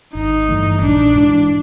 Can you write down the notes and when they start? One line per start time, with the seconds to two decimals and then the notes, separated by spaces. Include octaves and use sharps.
0.15 G#1 D#4
0.48 G2 E3 A3
0.82 A#1 D4
1.15 G#2 E3